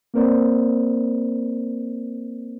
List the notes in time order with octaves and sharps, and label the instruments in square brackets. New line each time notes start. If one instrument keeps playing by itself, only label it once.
[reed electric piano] A#3 C4 A#4 C5 D5